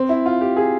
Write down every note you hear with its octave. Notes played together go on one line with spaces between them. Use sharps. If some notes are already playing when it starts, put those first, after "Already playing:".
Already playing: C4
E4
F4
G4
G#4